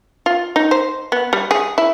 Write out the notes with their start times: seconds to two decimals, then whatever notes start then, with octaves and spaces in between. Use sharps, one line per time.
0.26 F4
0.56 D#4
0.71 C5
1.12 B3
1.33 G3
1.51 G#4
1.78 E4